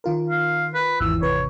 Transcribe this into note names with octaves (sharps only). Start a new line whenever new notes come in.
D#3 F4 A#4
F5
B4
G#1 E2 E3 E6
G#1 C3 B4 C#5